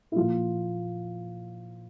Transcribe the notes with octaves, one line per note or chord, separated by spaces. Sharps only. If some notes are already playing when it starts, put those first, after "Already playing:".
E4
A#2 F3 F4